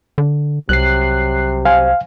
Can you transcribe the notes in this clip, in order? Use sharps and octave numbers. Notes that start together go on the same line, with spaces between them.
D3
C2 C3 F#3 F#6 C7
C5 F5 G#5